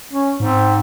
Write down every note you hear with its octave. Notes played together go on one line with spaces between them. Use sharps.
C#4
G#2 C4